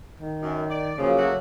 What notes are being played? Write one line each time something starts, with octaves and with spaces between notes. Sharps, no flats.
D#3
F#2
D5
C#3 F3 F#3 A#3
A3 F#4